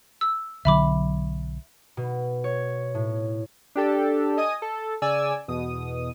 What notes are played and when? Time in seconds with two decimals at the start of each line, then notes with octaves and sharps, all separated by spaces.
0.21 E6
0.65 B1 D3 F#3 E5 B5 D6
1.97 B2
2.44 C#5
2.95 A2
3.75 D4 G4 A4
4.37 D#5 G#5 D#6
4.62 A4
5.02 C#3 D5 G#5 E6
5.48 E2 B2 D#6